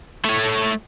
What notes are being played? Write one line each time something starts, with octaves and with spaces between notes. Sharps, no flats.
A3 C#5